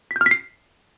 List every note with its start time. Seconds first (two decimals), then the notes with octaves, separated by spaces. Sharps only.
0.11 B6
0.16 G6
0.21 F6
0.26 B6
0.31 C7